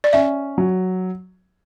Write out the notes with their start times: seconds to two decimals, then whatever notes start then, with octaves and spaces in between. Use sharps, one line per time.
0.04 D5
0.13 C#4 E5
0.58 F#3